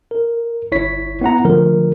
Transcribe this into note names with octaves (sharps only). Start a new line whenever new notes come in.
A#4
G1 E4 C#5 B6
B3 E4 F#5 A#5
D3 F3 A3 A#4